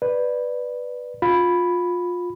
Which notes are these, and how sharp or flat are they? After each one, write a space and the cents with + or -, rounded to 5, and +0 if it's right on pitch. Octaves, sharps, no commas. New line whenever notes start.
B4 +0 D5 +10
F4 +25 B5 +0